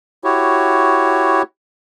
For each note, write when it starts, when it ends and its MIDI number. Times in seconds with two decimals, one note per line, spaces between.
0.24 1.42 64
0.24 1.42 66
0.24 1.42 67
0.24 1.42 73